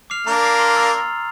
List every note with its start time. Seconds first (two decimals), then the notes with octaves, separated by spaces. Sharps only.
0.10 D6 F6 C7 F7
0.27 A#3 D4 A#5
0.43 D6 F6 C7 F7
0.59 C6
0.76 E6 A6 C7 F7